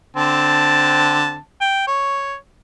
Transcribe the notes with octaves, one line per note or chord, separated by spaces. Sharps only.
D3 C4 A5
G5
C#5